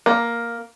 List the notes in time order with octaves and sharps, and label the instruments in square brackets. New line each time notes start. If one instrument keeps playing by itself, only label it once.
[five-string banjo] A#3